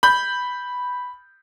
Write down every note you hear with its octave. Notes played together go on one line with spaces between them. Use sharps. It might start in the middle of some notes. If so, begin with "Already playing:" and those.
B5 G6